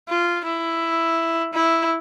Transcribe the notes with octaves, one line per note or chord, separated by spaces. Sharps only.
F4
E4
E4